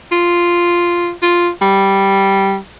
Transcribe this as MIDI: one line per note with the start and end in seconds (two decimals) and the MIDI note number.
0.12 1.12 65
1.22 1.50 65
1.62 2.58 55